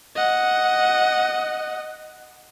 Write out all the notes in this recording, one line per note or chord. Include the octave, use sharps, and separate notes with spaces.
D#5 F#5